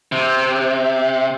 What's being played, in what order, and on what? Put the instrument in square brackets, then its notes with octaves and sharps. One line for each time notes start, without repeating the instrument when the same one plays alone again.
[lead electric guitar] C3